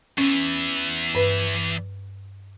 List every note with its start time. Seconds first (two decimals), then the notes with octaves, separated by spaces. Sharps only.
0.18 E2 E3 C#4
1.15 G2 B4